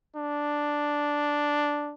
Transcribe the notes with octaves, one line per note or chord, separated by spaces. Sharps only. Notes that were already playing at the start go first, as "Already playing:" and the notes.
D4